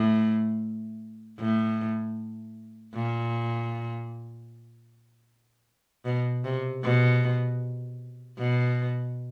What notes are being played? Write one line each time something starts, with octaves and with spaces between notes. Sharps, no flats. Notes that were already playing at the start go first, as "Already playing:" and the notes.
Already playing: A2
A2
A#2
B2
C3
B2
B2